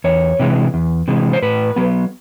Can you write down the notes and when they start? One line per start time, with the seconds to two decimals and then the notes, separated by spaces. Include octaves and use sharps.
0.04 E2 C#5
0.40 C3 E3 G#3
0.74 E2
1.08 C3 E3 G#3
1.33 C5
1.42 A2 B4
1.76 F#3 B3